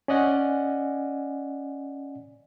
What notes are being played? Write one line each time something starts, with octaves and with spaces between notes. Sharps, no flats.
C#4 D5 D#5 F#5 G#5